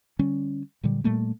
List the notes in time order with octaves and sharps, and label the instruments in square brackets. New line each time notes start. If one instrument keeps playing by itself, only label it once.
[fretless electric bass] D3 G3 C#4
A#2 D3 F#3 G3
A#2 G3 A3 A#3